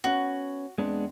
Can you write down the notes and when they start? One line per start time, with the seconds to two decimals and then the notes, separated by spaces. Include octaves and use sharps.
0.04 B3 C#4 F#4 F#5
0.78 E2 G#3 B3 C4 D4